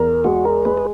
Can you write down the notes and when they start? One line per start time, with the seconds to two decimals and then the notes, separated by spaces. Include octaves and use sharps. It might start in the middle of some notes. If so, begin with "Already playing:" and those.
Already playing: E2 A#4
0.24 G#3 F#4
0.45 A#4
0.65 G#3 B4
0.77 G#4